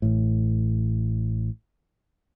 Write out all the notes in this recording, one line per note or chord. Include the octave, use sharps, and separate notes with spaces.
A1 A2